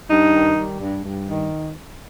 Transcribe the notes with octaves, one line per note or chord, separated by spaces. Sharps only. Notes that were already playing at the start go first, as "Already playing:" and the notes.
G2 D#4
D#3
G3
G2
G2
D#3